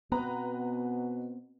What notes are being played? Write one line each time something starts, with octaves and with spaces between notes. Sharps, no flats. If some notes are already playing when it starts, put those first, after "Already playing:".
B2 B3 C4 B4 A#5